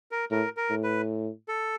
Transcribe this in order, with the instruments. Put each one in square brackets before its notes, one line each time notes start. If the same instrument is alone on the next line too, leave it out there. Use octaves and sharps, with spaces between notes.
[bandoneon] A#4
[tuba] A2 [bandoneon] A#4
[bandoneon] A#4
[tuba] A2
[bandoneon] B4
A4